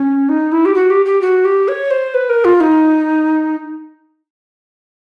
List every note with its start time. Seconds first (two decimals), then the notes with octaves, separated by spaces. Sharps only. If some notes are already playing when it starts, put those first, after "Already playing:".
Already playing: C#4
0.29 D#4
0.52 E4
0.65 G4
0.75 F#4
0.90 G4
1.05 G4
1.21 F#4
1.45 G4
1.68 C#5
1.91 C5
2.14 B4
2.29 A#4
2.45 F4
2.60 D#4